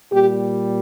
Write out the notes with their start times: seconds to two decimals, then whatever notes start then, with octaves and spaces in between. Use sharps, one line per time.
0.11 A#2 G3 G4